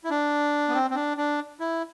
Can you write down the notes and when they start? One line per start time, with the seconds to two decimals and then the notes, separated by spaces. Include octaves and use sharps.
0.04 E4
0.10 D4
0.68 B3
0.74 C4
0.90 C4
0.95 D4
1.17 D4
1.60 E4